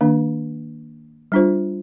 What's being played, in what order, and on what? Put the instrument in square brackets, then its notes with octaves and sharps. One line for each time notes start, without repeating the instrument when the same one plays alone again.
[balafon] D#3 A#3 D4
G3 D4 F4 C5